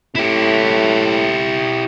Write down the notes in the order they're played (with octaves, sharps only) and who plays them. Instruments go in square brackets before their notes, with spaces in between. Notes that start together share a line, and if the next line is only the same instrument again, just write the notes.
[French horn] A2 [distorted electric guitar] E4 G4